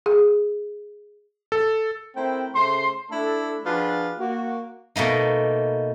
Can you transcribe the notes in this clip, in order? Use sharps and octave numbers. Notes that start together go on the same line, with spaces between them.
G#4
A4
A3 C4 E4 A#4 C5 G5
C#3 A3 C5 C6
A3 D4 E4 A4
F3 D4 F4 F#4 G#4 B4
A#3 F#4
B2 A3 A#3 D#4